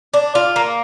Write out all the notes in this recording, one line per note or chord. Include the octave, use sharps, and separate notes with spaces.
D4
F4
A#3